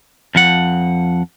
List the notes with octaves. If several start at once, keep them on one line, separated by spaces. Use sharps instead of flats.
F2 F3 F#5